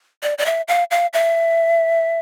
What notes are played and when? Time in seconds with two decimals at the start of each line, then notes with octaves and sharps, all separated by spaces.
0.23 D5
0.38 D5
0.46 E5
0.68 F5
0.91 F5
1.13 E5